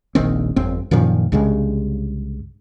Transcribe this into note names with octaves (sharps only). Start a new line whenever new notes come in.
D#1 A#1 D#3 C4
G1 F2 C4
F#2 A#2 D#3 F3
C2 G2 C#3 G#3